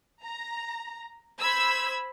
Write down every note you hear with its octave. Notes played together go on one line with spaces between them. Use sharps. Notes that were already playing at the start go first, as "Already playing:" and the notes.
A#5
C5 B5 E6 G#6